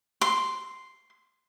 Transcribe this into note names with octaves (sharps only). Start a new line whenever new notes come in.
C6